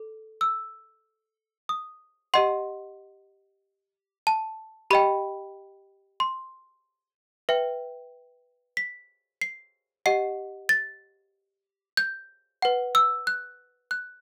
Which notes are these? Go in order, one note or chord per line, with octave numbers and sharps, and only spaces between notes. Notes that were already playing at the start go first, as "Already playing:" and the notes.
Already playing: A4
E6
D#6
G4 D#5 F#5 C6
A5
G4 D#5 G5 B5
C6
B4 E5 G5
B6
C7
G4 D#5 F#5 C7
A6
G6
B4 F#5
E6
F#6
F#6